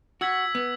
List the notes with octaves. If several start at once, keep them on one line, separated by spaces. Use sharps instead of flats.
F#4 E6 G#6 B6 F#7
B3